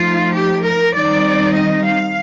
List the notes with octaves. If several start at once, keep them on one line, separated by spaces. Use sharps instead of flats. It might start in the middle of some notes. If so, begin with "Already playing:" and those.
Already playing: F3 A3 D#4 F4
G4
A#4
D#3 G3 C4 D#4 D5
D#5
F5